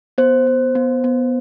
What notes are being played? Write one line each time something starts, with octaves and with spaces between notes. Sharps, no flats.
B3 C5
B3
B3
B3